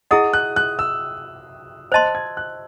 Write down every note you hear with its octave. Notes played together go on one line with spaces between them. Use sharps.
E4 G#4 D#5 F#5 D#6
F#6
F#6
E6
C5 D#5 A5 C6 F#6
G#6
F#6